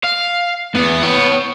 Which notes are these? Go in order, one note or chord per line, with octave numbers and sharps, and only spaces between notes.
F5
E2 G#2 B3
C#5 G5